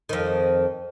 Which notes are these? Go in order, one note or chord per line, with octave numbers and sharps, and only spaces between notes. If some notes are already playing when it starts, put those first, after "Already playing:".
F2 D#3